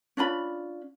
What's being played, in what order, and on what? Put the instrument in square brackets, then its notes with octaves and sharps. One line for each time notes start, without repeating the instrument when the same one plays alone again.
[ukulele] C#4 D4 F4 B5